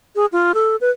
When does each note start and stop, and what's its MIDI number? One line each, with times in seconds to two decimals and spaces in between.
0.16 0.26 68
0.32 0.52 65
0.54 0.76 69
0.81 0.90 71